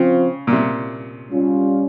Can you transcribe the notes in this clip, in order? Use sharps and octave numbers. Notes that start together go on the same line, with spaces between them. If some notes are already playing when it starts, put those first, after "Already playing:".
Already playing: C#3 F3 C4 F4
A#2
C3
G3 C#4 F4